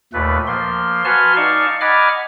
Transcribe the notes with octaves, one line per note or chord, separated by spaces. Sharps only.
D#2 A#2 A3 B4
F3 A#3 C6
F#4 B4 G#5 A5 C6 F6
D#4 D5 F5 A5 C#6
D#5 F#5 G#5 B5 D6 F6